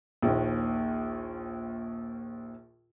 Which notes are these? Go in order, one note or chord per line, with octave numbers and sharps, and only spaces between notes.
A#1 D#2